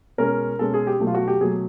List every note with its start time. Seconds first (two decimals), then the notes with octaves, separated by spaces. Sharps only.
0.18 B2 G#3 C#4 A#4
0.59 B2 G#3 C#4 A4
0.74 G#4
0.87 G4
1.00 B2 F#3 A3
1.07 F4
1.15 F#4
1.28 G4
1.41 B2 F#3 A3 G#4